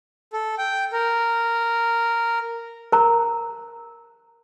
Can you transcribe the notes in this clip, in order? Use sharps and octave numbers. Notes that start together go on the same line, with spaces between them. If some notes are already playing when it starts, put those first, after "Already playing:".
A4
G5
A#4
A#4 A#5